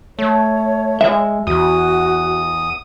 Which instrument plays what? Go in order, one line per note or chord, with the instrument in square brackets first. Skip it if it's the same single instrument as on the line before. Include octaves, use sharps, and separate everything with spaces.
[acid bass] A3 [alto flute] C#5
[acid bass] G#3 [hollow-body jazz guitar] E5
[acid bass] E2 [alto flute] F#4 [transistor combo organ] D#6